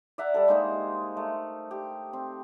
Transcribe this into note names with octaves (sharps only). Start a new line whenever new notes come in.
D5 E5 F#5 A#5
G3 A4
G#3 A#3 D#4 C5
A3
G4
C4